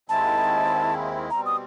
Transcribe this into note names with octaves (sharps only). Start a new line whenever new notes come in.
D#2 D#3 G#3 C4 E4 A5
B2 G3 C4 A#5
D#6